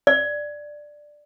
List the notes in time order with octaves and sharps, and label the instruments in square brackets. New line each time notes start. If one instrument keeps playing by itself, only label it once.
[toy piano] D5